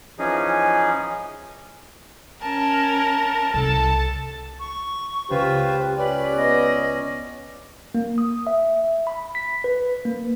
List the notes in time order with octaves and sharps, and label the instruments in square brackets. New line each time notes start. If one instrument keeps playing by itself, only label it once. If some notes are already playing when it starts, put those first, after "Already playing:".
[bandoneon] E3 F3 C#4 D#4 G#4
[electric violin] C#4 A#4 [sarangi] A5
[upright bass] C2 [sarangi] A4 [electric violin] A5
[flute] C#6
[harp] C#2 E7 [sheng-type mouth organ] F4 B4 C5 [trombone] G4
[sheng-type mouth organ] C#4 D5 [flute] B4
[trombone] B3 [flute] D#5
[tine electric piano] A#3
D#6
E5
B5
B6
B4
A#3